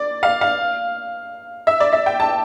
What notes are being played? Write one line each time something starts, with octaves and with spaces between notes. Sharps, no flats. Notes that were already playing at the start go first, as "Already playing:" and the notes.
Already playing: D5
F5
F5
E5
D5
E5
G5
A5